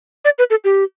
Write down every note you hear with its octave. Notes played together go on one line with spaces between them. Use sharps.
D5
B4
A4
G4